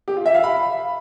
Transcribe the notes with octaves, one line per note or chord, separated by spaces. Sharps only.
G4
F4
E5
F5
B5